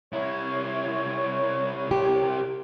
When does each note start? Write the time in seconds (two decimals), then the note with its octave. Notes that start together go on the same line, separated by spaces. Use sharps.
0.13 C2 E4 C#5
1.91 G4